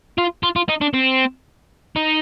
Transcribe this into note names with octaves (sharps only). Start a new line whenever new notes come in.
F4
F4
F4
D#4
D4
C4
D#4